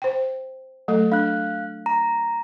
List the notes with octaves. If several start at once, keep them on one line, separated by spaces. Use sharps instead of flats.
C5 G5
F#3 A3 A4
D4 F5 F#6
A#5